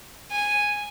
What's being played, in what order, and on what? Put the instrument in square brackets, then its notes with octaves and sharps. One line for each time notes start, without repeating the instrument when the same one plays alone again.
[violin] G#5